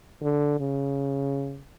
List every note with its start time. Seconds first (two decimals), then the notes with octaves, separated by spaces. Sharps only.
0.22 D3
0.60 C#3